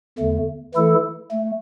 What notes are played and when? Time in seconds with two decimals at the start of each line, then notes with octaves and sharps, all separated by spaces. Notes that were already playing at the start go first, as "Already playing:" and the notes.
0.19 E2 D3 A3
0.74 E3 A3 E4 A4
1.31 A3